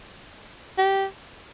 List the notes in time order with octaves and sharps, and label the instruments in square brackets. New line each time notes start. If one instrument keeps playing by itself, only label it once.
[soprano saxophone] G4